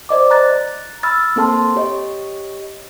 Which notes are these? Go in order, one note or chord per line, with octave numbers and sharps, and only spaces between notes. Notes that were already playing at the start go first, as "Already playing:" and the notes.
C5 D5 D#5 D6
A#5 F#6 A6
B5 E6 F6 A6
A#3 C4 A4 A5 C6
G4 C#5 D#5